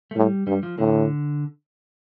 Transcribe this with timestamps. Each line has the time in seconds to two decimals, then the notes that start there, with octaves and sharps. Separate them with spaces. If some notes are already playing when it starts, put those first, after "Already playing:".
0.11 A3
0.16 A2 G3
0.47 G2 G3
0.63 F3
0.78 A2 D3